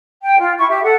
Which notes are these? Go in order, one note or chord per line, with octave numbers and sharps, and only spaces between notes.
G5
F4
E4 C#6
G4 E5
A4 F#5